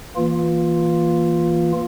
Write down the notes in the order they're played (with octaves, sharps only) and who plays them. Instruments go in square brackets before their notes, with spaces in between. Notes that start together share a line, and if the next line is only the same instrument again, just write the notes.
[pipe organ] E3 A#3 F4